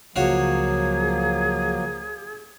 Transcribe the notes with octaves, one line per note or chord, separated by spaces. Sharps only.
C#2 F3 F#3 A#3 F4 F#4 G#4 C#5